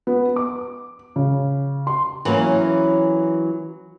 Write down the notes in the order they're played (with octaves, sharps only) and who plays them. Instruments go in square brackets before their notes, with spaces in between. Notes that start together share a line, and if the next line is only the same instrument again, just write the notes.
[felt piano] B3
D6
C#3
C6
[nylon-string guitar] E3 F#3 A#3 C#4